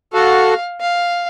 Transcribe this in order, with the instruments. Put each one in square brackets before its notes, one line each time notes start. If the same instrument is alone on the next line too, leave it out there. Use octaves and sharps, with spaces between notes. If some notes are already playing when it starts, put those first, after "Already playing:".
[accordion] F#4 A4 [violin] F5
[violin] F5